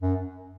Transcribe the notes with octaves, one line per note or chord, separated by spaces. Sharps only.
F#2